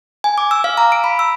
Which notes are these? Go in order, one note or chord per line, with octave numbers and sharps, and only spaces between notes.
G#5
D6
E6
F5
A#5
D7
B5
E6